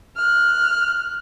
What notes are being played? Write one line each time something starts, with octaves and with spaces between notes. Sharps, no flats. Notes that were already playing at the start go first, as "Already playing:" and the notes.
F6 F#6